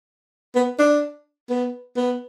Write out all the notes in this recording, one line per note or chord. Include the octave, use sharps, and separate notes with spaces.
B3
D4
B3
B3